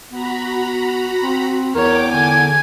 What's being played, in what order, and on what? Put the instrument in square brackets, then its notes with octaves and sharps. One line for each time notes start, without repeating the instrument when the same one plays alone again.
[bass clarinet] B3 [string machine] F#4 A#5 B5
[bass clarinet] C4
[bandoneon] E2 [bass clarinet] A#4 [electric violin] C#5 [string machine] G5 D6
[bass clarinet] D3 [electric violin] G#5 G#6